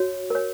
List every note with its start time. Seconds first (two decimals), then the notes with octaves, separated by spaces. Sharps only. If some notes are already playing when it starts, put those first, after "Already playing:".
Already playing: F#4 C#5
0.30 A#4 C#5